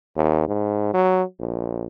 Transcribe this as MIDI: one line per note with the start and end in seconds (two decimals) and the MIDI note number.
0.16 0.46 39
0.48 0.93 44
0.94 1.23 54
1.39 1.85 34